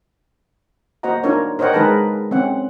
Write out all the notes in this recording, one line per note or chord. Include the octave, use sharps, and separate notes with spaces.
A#3 F#4 C5 D#5 F#5 A#5
D4 D#4 F4 A#4 C#5
A#4 C5 C#5 D#5 F#5 G5
G#3 D#4 G#4 A#4 B4 A5
C4 C#4 F#5